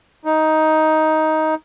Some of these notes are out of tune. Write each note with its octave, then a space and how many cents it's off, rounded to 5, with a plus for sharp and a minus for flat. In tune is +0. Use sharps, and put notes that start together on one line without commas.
D#4 +10